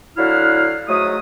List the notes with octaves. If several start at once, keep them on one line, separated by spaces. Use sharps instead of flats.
D3 F#3 E4 F5 F#5 F6
G#2 F#3 A3 D#6